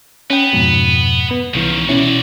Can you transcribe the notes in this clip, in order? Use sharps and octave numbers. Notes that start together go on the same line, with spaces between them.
B3 C#4 G5
F2 G#2 B2
B3
C2 G#2 C#3 E3
B2 C#4 E4 F#4 D5